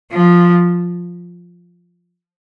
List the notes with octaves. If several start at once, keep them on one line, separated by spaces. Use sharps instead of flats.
F3